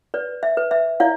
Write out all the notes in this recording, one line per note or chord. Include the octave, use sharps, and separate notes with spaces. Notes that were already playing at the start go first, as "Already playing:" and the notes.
B4 D5
E5
B4
E5
E4 D5 F5